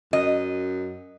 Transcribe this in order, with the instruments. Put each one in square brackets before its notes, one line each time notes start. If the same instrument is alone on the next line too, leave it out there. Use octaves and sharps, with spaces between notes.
[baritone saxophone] F#2 [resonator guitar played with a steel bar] D#5